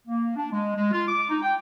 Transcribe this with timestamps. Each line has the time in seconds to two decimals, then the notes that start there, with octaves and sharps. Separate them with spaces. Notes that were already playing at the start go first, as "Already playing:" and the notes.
0.07 A#3
0.37 D4
0.52 G#3
0.77 G#3
0.92 F4
1.08 D6
1.29 D#4
1.42 G5